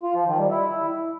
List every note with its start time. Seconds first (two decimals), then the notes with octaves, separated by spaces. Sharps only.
0.03 F4
0.15 F3
0.27 D#3
0.39 G3
0.50 E4